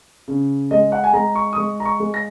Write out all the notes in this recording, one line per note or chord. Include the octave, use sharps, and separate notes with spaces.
C#3
G#3 D#5
F#5
G#5
G#3 A#5
C#6
D#6
G#3 C#6
A#5
C#6
G#3
A#6